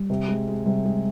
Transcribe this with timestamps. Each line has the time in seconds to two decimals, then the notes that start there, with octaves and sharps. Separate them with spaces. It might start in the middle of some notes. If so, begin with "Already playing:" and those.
Already playing: G3
0.10 C3
0.28 G#3
0.48 G#3
0.66 C3 G3
0.85 G#3